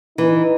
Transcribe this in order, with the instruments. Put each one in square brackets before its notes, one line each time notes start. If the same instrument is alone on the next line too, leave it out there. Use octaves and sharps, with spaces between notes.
[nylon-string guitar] E3 [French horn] D#4